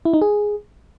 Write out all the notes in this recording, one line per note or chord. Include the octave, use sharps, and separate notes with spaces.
E4
D#4
G#4